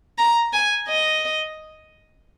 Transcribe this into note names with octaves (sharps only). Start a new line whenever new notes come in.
A#5
G#5
D#5